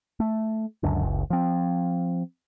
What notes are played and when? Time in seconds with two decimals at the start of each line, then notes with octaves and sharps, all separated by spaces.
0.20 A3
0.83 C#2 F#2 D3
1.02 F#1 C#2
1.30 F3 C4